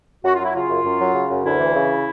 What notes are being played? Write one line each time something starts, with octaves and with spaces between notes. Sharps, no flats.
F#2 F#4
F4
F#3 E4
C#3 F4
F#2
F#2
F#3
C#3
F#2
D2 E4
E3
C#3